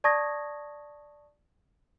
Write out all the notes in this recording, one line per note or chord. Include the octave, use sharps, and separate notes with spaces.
D5 A5 C#6 D#6 G#6 A#6